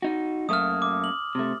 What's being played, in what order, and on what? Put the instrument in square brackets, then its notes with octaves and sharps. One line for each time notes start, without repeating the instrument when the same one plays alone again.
[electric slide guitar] D#4 F#4
[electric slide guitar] F#2 A3 A#3 [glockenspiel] D#6 F6
[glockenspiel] D6
F#7
[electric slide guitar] C3 A3